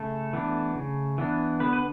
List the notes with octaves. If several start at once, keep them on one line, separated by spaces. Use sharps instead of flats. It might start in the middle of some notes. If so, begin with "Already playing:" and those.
Already playing: C#3 A3 A4
E3 B3 D4
C#3
E3 B3 D4
D3 B3 B4
B4